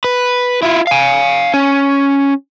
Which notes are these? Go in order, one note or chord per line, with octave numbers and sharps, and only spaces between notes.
B4
E4 F4
F5 G#5
C#4